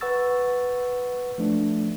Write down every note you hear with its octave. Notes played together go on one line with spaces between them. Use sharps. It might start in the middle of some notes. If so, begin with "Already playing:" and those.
B4 F#5 C#6 E6 A6
F3 A3 D4